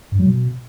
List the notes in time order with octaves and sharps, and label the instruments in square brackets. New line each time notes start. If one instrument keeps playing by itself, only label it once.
[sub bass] G2
F#3
B2